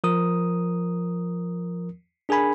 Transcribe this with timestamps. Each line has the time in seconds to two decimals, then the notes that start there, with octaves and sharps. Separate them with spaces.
0.04 F3 A#4 D#6
2.29 D4 G#4 A#4 G#5 B5